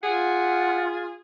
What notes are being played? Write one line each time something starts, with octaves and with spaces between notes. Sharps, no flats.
F4 G#4 F#5